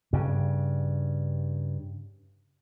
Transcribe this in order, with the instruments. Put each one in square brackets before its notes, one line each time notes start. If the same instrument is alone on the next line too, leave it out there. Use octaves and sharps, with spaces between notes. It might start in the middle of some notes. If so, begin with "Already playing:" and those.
[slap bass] G2 C#3